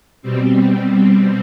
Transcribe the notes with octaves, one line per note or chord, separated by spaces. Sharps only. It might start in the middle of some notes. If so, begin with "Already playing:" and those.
B2 G3 C4